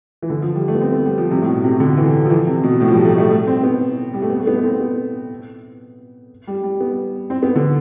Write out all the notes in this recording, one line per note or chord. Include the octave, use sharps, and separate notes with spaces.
E3
D3
F3
G3
A3
B3
C4
B3
G3
F3
C3
A2
B2
C3
D3
E3
F3
E3
C3
B2
A2
F3
G3
A3
A3
A3
C4
B3
G3
A3
B3
A3
B3
B3
C4
B3
G3
G3
B3
C4
B3
D3